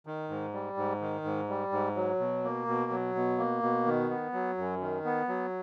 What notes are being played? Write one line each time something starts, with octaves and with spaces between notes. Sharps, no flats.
D#3
G#2
G3
G#2
D#3
G#2
G3
G#2
F#3
B2
A#3
B2
F#3
B2
A#3
B2
D#3
B3
F#3
F#2
D#3
B3
F#3